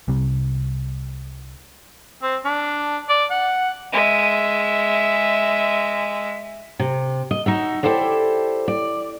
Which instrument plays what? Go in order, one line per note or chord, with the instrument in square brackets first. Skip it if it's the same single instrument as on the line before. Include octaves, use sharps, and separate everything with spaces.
[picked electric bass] C2 C3 G3
[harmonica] C4
D4
D5
F#5
[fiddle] G#3 E5
[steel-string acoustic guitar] C3
D#5
D#4 F#4 E5
E4 G4 A4 C5 D5
D5